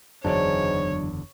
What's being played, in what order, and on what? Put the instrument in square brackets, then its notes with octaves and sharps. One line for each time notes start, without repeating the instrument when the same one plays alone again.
[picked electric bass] F#1 E2 D3 [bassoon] G#2 [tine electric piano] F#3 D4 [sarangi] C#5